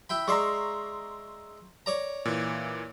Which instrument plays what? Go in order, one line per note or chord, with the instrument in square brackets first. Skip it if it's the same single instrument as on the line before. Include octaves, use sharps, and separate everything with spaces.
[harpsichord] E4 G5 B5
[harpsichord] G#3 D5 E5 [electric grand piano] A#5 C6 C#6
[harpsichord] C#5 D5 A#5
[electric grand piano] A#2 E3